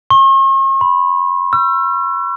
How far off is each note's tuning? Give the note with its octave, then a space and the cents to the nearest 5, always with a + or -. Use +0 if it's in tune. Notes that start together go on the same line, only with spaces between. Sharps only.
C#6 -45
B5 +5
E6 +40